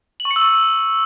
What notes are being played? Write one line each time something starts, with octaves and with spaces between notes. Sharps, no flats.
F#7
C#6
C#7
E6
C#6